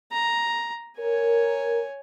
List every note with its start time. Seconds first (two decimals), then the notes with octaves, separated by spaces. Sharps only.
0.12 A#5
0.99 A#4 C#5 G#5